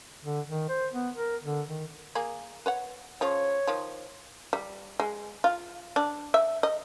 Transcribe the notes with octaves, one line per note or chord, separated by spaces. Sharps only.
D3
D#3
C5
B3
A#4
D3
D#3
A#3 G#4
B4 C#5 F#5
C#3 F3 F4 C#5
D#3 F3
G3
G#3
F4
D4
E5
D#5